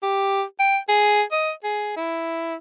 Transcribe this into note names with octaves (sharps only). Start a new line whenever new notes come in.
G4
G5
G#4
D#5
G#4
E4